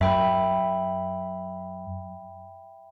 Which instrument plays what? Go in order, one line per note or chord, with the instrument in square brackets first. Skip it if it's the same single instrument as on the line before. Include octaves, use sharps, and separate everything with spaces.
[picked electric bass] F#2 [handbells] E5 G5 B5